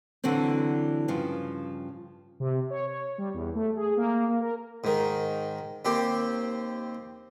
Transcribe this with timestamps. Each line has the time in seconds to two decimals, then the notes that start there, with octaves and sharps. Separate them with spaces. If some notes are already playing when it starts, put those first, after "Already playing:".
0.24 D3 E3 F#3 C4
1.08 G2 C#3 F3
2.40 C3
2.70 C#5
2.87 C#5
3.18 G3
3.34 E2
3.55 A3
3.76 G#4
3.97 A#3
4.28 A#3
4.41 A#4
4.84 G#2 D#3
5.85 D#2 C4 G4